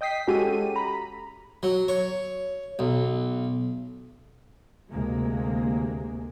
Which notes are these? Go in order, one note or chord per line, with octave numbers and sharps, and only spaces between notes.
D#5 G5 D#6 B6 C7
G#3 C#4 F#4 G4 A4 D#7
A#5 B5
F#3
C#5
B1
D2 C3 G#3 A#3